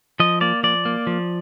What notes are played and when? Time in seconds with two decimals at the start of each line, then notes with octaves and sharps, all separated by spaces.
0.20 F3 D#5
0.41 A#3 D5
0.63 F3 D5
0.85 A#3
1.07 F3